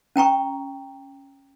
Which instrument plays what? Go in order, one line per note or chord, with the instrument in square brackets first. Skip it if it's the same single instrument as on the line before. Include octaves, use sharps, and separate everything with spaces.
[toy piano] C#4 G5 A#5 C#6